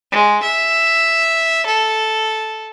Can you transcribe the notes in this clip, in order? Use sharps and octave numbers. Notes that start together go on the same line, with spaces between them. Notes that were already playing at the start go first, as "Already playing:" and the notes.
G#3
E5
A4